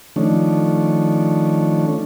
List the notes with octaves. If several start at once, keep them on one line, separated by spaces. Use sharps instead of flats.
D#3 F3 A3 C#4 D4